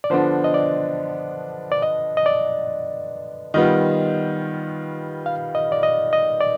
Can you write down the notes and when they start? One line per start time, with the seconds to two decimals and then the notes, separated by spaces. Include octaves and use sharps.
0.04 D5
0.10 D3 F3 B3 D4 C5
0.44 D#5
0.54 D5
1.72 D5
1.82 D#5
2.17 D#5
2.26 D5
3.54 D#3 G3 B3 F4 D#5
5.26 F5
5.55 D#5
5.72 D5
5.83 D#5
6.13 D#5
6.41 D5